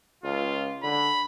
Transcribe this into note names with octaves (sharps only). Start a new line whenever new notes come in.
C#2 F4
D3 B5